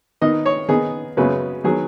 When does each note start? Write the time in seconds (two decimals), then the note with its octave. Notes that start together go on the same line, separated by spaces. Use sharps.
0.21 D#3 B3 D#4 D#5
0.46 C#5
0.68 D#3 B3 D#4 G#4
1.17 F#2 C#3 G#3 B3 B4
1.64 D#3 F#3 B3 G#4